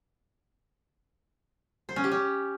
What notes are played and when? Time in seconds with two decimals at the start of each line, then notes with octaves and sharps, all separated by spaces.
1.89 C5
1.96 C#4
2.04 G4
2.11 C#4